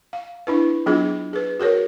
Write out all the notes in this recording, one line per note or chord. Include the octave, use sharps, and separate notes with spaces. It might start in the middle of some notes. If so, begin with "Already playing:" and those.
F5
D4 E4 B4
F#3 B3 D4 F4 G#4
G#4 B4
F#4 G#4 A#4 C#5